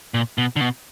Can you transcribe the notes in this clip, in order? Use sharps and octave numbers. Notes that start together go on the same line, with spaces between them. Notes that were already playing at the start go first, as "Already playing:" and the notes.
A#2
B2
D3
B2